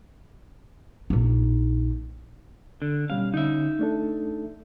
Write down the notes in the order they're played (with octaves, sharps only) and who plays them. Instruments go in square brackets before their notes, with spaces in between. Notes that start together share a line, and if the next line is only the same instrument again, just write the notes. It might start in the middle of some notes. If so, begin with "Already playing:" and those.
[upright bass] A#1 D#4
[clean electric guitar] D3
[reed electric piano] B2 G3 C#4 [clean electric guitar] F5
[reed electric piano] D3 C#4 [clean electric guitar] D#4 E5
[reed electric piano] A3 D4 A4